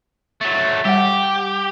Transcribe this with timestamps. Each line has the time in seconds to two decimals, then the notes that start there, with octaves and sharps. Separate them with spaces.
0.41 F#3 A3
0.85 G3 G4 F#5